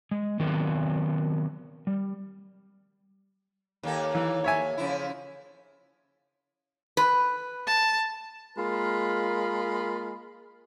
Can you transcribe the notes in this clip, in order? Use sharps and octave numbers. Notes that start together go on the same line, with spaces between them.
G#3
D#3 F#3 B3 C4 B4
G3
D#2 A#3 A4
E3
C#5 E5 G#5
C#3 F3 E4
B4
A5
G#3 A#3 F4 A#4 B5